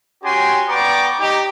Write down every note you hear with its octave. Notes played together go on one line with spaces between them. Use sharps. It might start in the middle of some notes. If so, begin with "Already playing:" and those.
C#4 F#4 G4 G5 G#5 C6
B3 D5 G5 A#5 C#6 D6
D#4 G4